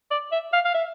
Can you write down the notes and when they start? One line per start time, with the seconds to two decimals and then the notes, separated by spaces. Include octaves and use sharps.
0.11 D5
0.32 E5
0.53 F5
0.65 F5
0.74 E5